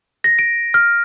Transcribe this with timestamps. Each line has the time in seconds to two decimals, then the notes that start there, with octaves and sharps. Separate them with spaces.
0.24 A#6
0.39 D7
0.74 F6